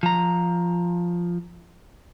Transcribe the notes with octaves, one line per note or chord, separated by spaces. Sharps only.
F3 A#5